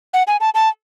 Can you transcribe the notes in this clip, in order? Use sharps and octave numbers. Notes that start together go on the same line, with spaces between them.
F#5
G#5
A5
A5